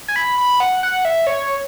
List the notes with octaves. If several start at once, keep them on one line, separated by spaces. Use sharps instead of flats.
G#5
B5
B5
F#5
F#5
E5
C#5